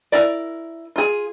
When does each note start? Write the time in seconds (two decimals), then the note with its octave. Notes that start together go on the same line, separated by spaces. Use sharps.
0.12 E4 A#4 D5
0.96 F4 G#4